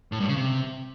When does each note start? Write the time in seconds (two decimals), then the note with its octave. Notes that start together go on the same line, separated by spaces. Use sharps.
0.12 A2
0.20 G2
0.28 C#3
0.37 C3